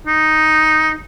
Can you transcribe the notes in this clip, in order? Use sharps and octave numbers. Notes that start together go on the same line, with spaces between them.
D#4